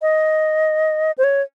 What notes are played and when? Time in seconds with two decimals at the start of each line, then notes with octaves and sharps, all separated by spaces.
0.02 D#5
1.18 C5
1.24 C#5